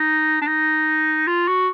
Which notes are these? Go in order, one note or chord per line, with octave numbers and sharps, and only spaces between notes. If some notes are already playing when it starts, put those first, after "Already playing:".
Already playing: D#4
D4
D#4
F4
F#4